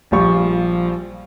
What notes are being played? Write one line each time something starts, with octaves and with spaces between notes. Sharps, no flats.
A#1 F3 G3 C#6